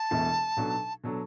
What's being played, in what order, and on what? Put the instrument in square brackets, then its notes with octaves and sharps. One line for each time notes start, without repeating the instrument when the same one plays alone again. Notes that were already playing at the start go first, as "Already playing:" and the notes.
Already playing: [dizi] A5
[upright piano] E1 E2 B2 A3 E4
B1 B2 F#3 D4 A4
B2 F#3 D4 A4